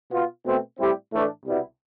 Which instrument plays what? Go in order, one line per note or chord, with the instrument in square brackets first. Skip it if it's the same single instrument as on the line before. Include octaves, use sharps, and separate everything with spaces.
[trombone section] B2 B3 F4
B2 A3 C4
A2 G3 C4 E4 G4
A2 E3 A3 D4
C2 B2 G3 B3 E4